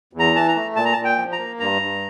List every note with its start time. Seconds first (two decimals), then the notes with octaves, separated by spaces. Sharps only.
0.13 E2
0.19 A#5
0.34 E3 A5
0.48 A#5
0.55 A3
0.76 A#2 A5
0.85 A#5
0.93 A5
0.98 A#2
1.04 G5
1.18 F3
1.32 A#5
1.39 A#3
1.60 G2 A#5
1.82 G2